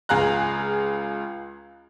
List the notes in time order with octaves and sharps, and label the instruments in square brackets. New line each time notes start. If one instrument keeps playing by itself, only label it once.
[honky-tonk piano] C#2 G#4 F5 A#5 F#6